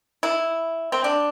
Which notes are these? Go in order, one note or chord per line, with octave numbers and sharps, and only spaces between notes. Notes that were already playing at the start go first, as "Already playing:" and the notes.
E4
C4
D4